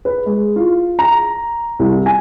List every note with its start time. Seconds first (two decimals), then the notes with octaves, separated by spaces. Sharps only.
0.05 B4
0.26 G#3
0.56 F4
0.99 A#5
1.79 C2
2.06 G#5